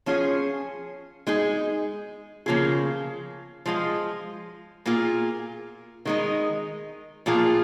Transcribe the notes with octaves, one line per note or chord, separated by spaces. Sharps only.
F3 C#4 F4 G#4
G#3 D#4 G#4
C#3 F3 A#3 F4 G#4
F3 G#3 F4
A#2 A#3 F4 G#4
D#3 G#3 D#4
A#2 F3 A#3 F4 G#4